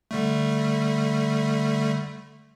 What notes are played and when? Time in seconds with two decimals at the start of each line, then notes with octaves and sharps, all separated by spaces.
0.11 D3 G3 A3